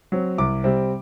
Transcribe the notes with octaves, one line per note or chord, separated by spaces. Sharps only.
F#3 C4
C2 D6
C3 G3 C4